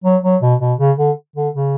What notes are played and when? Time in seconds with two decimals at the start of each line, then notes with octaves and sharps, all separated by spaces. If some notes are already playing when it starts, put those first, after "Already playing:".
0.04 F#3
0.24 F#3
0.42 B2
0.61 B2
0.79 C#3
0.98 D3
1.36 D3
1.54 C#3